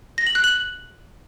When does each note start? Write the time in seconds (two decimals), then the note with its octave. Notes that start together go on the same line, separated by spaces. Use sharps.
0.18 A#6
0.27 F#7
0.35 F#6
0.44 F#7